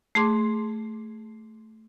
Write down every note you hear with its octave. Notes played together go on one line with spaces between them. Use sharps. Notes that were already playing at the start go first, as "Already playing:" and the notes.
A3 G#4 A5 C6 D6